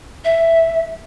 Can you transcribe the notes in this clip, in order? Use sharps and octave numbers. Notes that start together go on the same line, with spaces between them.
E5